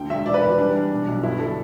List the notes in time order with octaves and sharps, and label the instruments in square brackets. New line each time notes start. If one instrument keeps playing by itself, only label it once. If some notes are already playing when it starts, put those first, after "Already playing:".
Already playing: [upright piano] D2 D3 G5
E1 E5
E3 D5
B4
E3
G3 D4
G3
B2
B1
G2 E4
D3 A4